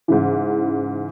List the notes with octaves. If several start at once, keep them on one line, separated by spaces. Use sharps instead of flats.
G#2 C#3 E3